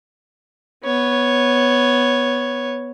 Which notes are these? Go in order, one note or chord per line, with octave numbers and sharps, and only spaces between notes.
B3 C#5